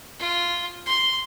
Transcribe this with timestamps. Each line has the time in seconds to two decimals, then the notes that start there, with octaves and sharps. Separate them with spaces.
0.19 F4
0.86 C6